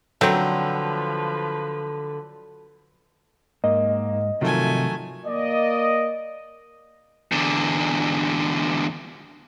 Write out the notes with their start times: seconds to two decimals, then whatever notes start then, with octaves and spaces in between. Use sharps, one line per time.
0.21 D3 F3 F#3 A3 C4 B4
3.64 G#2 A#3 D#5
4.41 C3 D#3 F3 F#3 A3 G#5
5.26 A#3 D5 D#5
7.32 E2 D3